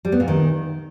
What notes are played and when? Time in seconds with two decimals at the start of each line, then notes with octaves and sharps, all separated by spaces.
0.05 G3
0.12 B3
0.20 A#2
0.28 D#3